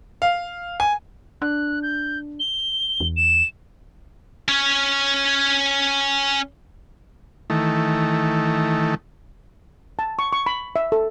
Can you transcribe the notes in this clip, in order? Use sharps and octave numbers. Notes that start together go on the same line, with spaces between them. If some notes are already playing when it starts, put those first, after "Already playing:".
F5
G#5
D4 F#6
G6
G7
E2
E7
C#4 C#5
D#3 E3 A3
A5
C#6
C#6
B5
E5
A4